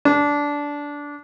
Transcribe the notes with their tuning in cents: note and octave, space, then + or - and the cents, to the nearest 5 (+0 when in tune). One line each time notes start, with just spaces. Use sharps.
D4 -15